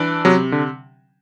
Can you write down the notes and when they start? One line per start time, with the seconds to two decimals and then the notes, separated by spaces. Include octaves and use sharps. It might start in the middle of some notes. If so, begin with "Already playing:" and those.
Already playing: E3 D4
0.25 C3 F#3
0.52 D3